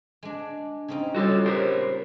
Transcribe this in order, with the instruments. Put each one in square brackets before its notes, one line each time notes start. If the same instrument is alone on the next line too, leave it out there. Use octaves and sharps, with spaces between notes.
[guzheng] G#3 D4
C#3 C4 D#4
[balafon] G3 F4 C#5 [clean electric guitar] F#4 A4
[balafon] G4 C#5 [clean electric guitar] A#4 C5